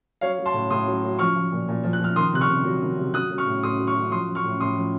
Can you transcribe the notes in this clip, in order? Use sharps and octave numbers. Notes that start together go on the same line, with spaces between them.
F#3 C#5 F5
F#3
A5 C6
A2
A2 C6 D#6
F#3
F#3
F3 C#6 F6
F3
A#2
A#2
F3
F#6
F3 F6
D#3 C6 D#6
C3 F#6
C#6 F6
C3
F#3
D#3
C3
F#3 D#6 F#6
F#3
C#6 F6
A2
A2 C6 D#6
F#3
C#6 F6
F#3
F3 C6 D#6
F3
C#6 F6
A2
A2 C6 D#6
F3